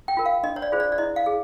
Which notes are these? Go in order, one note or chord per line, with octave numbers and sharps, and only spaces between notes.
G5
F4 A#4
F5
D4 D#5
C#5
D5
F4 G#4 C5
D5
D5
E4 D#5
F5
G#4